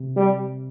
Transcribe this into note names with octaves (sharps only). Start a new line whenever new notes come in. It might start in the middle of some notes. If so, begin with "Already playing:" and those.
Already playing: C3
G3